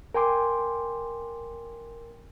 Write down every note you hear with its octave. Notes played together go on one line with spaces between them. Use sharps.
A#4 G5 G#5 C6 D6